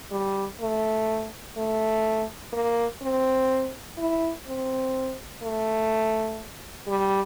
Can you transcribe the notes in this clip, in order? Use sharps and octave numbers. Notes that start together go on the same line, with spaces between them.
G3
A3
A3
A#3
C4
E4
C4
A3
G3